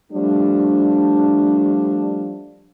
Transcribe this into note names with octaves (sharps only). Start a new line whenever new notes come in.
F3 G3 A3 D4